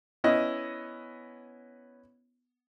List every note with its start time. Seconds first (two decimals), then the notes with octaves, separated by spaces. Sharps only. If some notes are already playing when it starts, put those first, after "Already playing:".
0.24 B3 C#4 E4 D#5